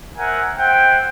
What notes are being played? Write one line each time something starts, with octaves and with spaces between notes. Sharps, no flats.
A#4 C5 E5 F#5 G#5
C5 E5 F#5 G5